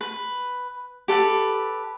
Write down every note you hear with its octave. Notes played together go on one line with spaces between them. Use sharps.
B4
G4 A4 B4